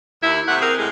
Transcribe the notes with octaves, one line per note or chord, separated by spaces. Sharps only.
D#2 E4
C3 A3 F#5
C4 G#4 A#4
A2 G#3